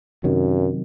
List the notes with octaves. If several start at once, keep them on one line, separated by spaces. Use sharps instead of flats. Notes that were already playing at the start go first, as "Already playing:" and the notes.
F#2 C3 D#3 F#3